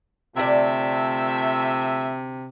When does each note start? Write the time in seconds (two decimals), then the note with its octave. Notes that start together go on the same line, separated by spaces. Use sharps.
0.36 D2 C3 F3 A3 D5 E5